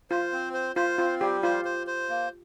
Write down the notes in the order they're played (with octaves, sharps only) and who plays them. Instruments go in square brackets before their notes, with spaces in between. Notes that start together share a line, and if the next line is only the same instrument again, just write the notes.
[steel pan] F4 [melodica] C5
[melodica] C4
C5
[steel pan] F4 [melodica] C5
[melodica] C4 [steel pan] F4
[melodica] G3 [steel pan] G4
[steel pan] F4 [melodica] C5
[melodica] C5
C5
A#3